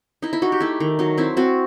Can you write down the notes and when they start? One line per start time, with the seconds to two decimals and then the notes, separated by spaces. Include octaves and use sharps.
0.22 D#4 E4
0.33 E4
0.42 D#4 F#4
0.52 G4
0.60 A3 E4
0.80 D#3
0.99 F#3 D#4
1.18 C4 E4
1.37 C4 F#4